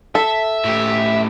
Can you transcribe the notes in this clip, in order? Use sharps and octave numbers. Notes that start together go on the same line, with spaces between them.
A4 E5
A2 G4